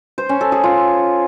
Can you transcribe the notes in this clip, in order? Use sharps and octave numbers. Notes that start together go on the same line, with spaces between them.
C5
C#4
A4
G#4
F4